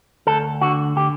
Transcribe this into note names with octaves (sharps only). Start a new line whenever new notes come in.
D2 A4
D3 F#4
D3 G4